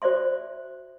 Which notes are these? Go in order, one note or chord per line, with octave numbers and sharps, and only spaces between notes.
F#4 C5 D5 E5 C6